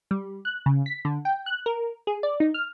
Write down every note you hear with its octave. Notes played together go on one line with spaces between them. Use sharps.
G3
F#6
C#3
B6
D3
G5
F#6
A#4
G#4
D5
D#4
F6